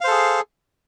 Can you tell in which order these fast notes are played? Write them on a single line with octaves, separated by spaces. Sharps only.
F5 C5 A4 G#4